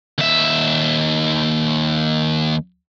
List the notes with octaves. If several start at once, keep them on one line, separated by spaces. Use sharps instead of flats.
D#2 E5